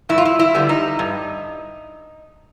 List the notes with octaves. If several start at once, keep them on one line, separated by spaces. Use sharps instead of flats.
G2 E4
F4
E4
E4
D3 G3 B3
D#4
G2